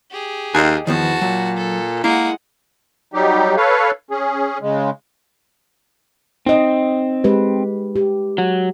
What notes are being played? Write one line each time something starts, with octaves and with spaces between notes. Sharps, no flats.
G4 G#4
D#2 D#5 F#5 G#5
E2 D#3 F3 B3 F#4 A5
A#2 F#3
A4
G#3 A#3 E4 F#5
F#3 G3 D#4 G4
A4 B4 C#5 F5
C#4 G#4
C#3 G#3
C4 D#4 D#5
G#3 G4 B4
G4
F#3